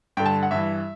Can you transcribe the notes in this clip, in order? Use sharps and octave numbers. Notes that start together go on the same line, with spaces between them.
G2 D3 G5
A5
F#5
G2 E3 E5